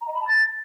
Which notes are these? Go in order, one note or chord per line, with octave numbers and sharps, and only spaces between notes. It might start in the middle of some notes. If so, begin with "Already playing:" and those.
A#5
D#5
B5
A5
A6